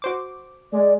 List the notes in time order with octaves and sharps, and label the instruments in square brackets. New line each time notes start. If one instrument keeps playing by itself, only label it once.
[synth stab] F#4 C5 D6
[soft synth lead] G#3 [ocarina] D5